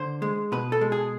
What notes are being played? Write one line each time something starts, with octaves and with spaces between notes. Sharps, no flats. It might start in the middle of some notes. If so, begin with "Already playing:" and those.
Already playing: D3 C5
G#3
B2 B4
A4
G#3
G#4